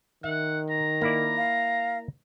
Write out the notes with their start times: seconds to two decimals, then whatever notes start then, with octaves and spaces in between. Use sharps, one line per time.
0.24 D#3 E5 F#5
0.70 A#5
1.02 A#3 E4 D5
1.37 F5